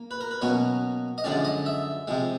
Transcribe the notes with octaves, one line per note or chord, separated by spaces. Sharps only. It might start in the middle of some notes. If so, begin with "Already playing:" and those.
Already playing: A#3
B4
A#4
B4
B2 F#3 A#3 C#4 C#5
D#5
F#2 D3 F3 G#3 C#4 D5
D#5
E5
C3 F3 G#3